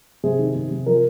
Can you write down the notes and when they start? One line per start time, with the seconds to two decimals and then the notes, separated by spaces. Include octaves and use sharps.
0.24 C3 G#4
0.39 D#3
0.56 C3
0.71 C3
0.86 F3 A#4